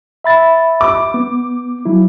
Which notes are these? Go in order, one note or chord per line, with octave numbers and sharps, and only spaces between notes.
E5 B5 A6
D6
B3
F#3 E4